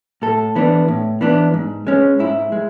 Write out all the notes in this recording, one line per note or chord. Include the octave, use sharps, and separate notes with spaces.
A2 A4
E3 B3 D4
A2
E3 B3 D4
G#2
G#3 C#4
G#2 E4
G#3